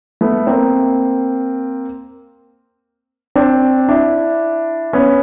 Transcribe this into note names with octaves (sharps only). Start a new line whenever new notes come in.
A3 B3
A#3 C4
C4 D4
D4 E4
B3 C#4